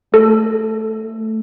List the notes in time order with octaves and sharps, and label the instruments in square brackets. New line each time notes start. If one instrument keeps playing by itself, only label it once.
[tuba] A3 [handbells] A4